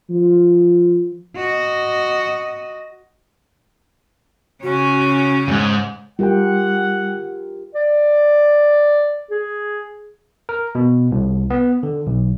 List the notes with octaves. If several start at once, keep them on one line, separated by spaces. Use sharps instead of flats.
F3
F#4 D#5
C#3 C#4 F#4
E2 G#2
G3 F4 G4 A#4 F#5 G5
D5
G#4
A#4
B2
C2
B3
D3
B1